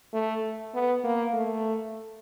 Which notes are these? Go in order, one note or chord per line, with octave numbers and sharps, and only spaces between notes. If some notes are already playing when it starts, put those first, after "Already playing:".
A3
B3
A#3
A3